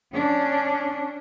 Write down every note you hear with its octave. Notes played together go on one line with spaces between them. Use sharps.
C#4 D4